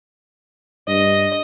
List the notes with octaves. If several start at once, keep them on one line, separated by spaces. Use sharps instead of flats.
G2 D#5